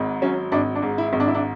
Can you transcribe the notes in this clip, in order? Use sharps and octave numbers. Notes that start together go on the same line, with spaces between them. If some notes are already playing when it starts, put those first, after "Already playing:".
Already playing: G#1 G#2
F#3 C#4
G#1 D4
D4
G#2
E4
G#1
D4
E4
D4